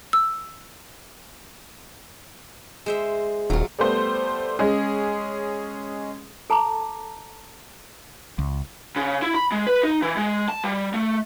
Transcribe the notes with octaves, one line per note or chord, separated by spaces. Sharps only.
E6
G#3 C5 E5
D#1 F#3 F4
G3 A3 B3 C5
G#3 C#4 G#4
A4 A5 A#5 D6
C#2
C#3
E4
B5
G#3
B4
D#4
E3
G#3
A5
G3
A3